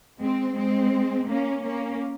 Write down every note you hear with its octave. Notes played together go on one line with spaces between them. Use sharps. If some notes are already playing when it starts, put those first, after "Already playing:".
G#3 C4
G#3 C4
A#3 C#4
A#3 C#4